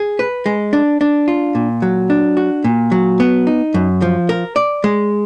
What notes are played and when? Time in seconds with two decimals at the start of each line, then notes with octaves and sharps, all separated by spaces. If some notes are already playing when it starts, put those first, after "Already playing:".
Already playing: G#4
0.19 B4
0.46 G#3
0.73 D4
1.01 D4
1.28 F4
1.55 A#2
1.82 F#3
2.10 D4
2.37 F#4
2.64 A#2
2.92 F#3
3.20 B3
3.47 D#4
3.74 F#2
4.02 F3
4.29 A#4
4.56 D5
4.84 G#3